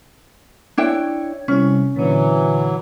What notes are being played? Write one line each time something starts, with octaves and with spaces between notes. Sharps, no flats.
D4 E4 C#5 G5 C#6 G#6
C3 G3 C#4 E4
A#2 D3 E3 F#3